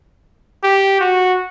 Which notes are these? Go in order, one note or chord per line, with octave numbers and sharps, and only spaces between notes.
G4
F#4